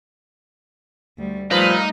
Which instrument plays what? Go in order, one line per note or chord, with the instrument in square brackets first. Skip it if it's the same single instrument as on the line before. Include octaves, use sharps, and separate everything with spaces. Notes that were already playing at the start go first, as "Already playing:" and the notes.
[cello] D2 G3
[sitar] A#2 B4 [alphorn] F3 [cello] G3 A3 [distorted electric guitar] D#4